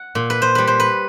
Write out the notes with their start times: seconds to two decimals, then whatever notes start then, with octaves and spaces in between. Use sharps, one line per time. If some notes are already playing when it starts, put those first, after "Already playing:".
Already playing: F#5
0.15 A#2
0.30 B4
0.42 C5
0.55 G3 B4
0.67 C5
0.80 B4